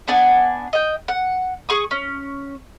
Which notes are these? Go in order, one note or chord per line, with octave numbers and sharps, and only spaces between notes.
B3 D4 F#5 G#5
D#5 G5
F#5
G#4 C#6 D#6
C#4